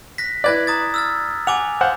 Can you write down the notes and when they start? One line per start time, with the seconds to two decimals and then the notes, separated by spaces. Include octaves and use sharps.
0.18 F#6 A#6 B6
0.44 E4 B4 D5 F#6 G#6 A#6
0.67 A#5 D#6 A6
0.94 E6 F6 A6
1.47 F#5 G#5 D6 F7
1.81 C5 F5 F#5